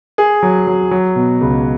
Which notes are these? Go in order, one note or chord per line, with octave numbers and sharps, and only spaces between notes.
G#4
F#3
F#3
F#3
B2
C#2